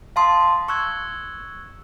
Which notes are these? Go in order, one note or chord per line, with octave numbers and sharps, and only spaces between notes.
F5 A5 C6 D#6
C#6 E6 F#6 G#6